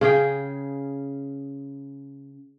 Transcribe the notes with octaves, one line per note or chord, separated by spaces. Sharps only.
C#3 C#4 G#4 G5